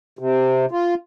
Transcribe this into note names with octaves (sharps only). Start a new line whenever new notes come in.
C3
F4